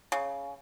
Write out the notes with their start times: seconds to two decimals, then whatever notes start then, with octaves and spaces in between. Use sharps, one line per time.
0.12 C#3